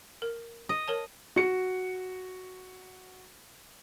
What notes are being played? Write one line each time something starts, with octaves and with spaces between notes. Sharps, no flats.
A#4
D#5
A#4 C#5 A5
F#4 C#7